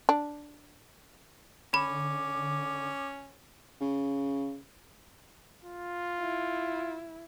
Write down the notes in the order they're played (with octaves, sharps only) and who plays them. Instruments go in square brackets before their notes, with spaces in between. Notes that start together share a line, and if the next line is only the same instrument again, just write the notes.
[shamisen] D4
[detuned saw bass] D3 [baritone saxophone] C#4 [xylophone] B5 [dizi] D6
[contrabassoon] C#3
[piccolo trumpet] F4
[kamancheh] E4